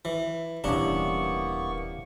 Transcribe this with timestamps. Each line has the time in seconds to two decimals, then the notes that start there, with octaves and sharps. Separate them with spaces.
0.05 E3
0.64 D#1 C3 E3 A#3 B3 C#4 D4 C#6